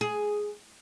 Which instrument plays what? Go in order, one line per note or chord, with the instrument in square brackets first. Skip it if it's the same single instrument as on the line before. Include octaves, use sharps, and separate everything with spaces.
[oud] G#4